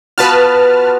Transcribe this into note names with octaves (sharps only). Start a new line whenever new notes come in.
B3 F4 F#4 B4 A5 F6